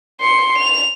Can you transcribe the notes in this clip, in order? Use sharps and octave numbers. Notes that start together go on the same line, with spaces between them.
C6 C#7
F7